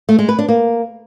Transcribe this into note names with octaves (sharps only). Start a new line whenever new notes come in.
A3
G#3
B4
D4
A#3